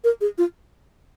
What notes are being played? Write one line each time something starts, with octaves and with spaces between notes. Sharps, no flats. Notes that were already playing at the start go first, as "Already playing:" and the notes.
A#4
G#4
F4